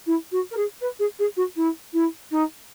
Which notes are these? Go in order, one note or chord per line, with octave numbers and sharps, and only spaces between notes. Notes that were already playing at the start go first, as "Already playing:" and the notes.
E4
F#4
A#4
G#4
B4
G#4
G#4
F#4
E4
E4
D#4